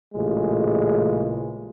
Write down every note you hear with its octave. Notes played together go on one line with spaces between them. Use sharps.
A1 A#2 C#3 G#3